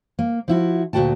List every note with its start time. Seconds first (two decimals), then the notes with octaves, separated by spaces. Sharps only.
0.19 A#3
0.48 F3 E4 F#4
0.93 D2 A#2 D#4 F#4 G5 A5